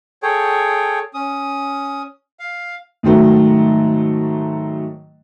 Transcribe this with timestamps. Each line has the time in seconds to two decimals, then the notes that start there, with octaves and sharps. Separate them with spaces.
0.23 G#4 A4 C#5 G5
1.14 C#4 D#6
2.39 F5
3.03 G#2 D#3 F#3 A3